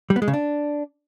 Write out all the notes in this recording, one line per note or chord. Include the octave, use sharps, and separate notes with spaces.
G3
B3
G#3
C#3
D4